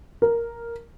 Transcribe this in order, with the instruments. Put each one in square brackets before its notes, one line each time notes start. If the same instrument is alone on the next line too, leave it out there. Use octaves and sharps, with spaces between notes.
[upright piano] A#4